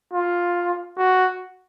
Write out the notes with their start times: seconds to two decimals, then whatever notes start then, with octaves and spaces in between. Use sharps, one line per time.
0.13 F4
0.97 F#4